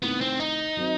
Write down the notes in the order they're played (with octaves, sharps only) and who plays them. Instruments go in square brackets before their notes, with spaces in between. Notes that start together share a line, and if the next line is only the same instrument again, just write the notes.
[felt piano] C3 D#3 A3 E4 [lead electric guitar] B3
[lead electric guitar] C4
D#4
[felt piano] D#3 F#3 C4